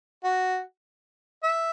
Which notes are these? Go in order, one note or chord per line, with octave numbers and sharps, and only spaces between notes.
F#4
E5